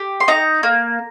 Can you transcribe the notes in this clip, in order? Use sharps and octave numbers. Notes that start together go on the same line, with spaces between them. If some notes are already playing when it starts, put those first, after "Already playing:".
Already playing: G4
C6
D#4 A#5
A#3